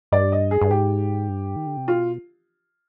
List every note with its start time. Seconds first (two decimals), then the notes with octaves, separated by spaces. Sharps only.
0.12 G2 D5
0.32 D#5
0.51 G#4
0.61 G2
0.71 G#2 G4
1.29 G2
1.56 D#3
1.66 D3
1.77 C3
1.88 B2 F4